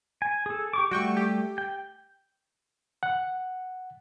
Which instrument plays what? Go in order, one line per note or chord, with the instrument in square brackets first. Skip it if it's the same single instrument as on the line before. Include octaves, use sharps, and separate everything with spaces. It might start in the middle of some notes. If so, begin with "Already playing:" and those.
[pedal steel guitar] G#5
G#4 A4
G4 C#6 D6
[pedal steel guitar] G3 A3 [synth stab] F#4 G5 C#6
[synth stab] G4
[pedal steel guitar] G5
[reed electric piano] F#5